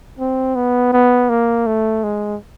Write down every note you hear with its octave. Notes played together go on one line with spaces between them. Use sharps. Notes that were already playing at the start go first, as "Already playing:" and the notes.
C4
B3
B3
A#3
A3
G#3